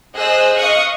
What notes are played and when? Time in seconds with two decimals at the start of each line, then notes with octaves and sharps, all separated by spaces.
0.13 G#4 C5 D#5 E6 F#6
0.55 D#5 F5 C#6 D#6 F#6